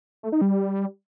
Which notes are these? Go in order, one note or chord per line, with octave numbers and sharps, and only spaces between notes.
A3
D#4
G3